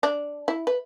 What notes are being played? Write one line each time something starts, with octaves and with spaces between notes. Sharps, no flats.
D4
E4
B4